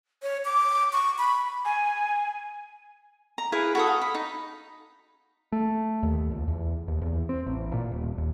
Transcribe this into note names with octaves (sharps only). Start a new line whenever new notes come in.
C#5
D6
C#6
B5
G#5
A#5
E4 G#4 B4 F5
F#4 A4 D#6
F5
B5
D#4
A3
D#2
C#2
E2
D#2
E2
C4
A1
A#2
D#1
D#2